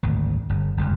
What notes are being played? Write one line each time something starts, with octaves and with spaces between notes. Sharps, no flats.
G#1 D2
G1
G1 C#2 F#2